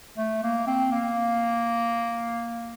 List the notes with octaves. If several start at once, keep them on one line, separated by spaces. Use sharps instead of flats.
A3
A#3
C4
A#3